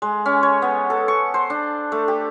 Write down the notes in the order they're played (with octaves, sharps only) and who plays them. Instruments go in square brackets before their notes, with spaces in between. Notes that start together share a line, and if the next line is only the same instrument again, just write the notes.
[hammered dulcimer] G#3
C#4
C#5
B3
A4
C#6
C5
D4
A3
G4